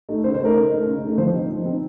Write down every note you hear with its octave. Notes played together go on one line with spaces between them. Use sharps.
A3 D#4
C#3 C5
C5
A3 D#4 A#4
C#3
A3 D#4
C#3
A3 D#4
F3 C5
C4 D#4
F3
C4 D#4